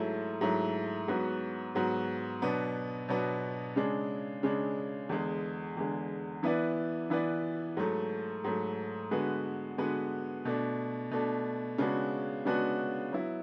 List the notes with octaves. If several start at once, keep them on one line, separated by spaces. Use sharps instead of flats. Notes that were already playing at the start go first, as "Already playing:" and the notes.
Already playing: G#2 F#3 A3 E4
G#2 F#3 A3 E4
G#2 F#3 B3 F#4
G#2 F#3 B3 F#4
B2 F#3 B3 D4
B2 F#3 B3 D4
C#3 G#3 D4
C#3 G#3 D4
E2 D3 G#3
E2 D3 G#3
E3 B3 E4 B4 D5
E3 B3 E4 B4 D5
G#2 F#3 A3
G#2 F#3 A3
D3 G#3 B3 F#4 B4
D3 G#3 B3 F#4 B4
B2 A3 D4
B2 A3 D4
C#3 G#3 B3 D4 F#4
C#3 G#3 B3 D4 F#4
F#3 B3 E4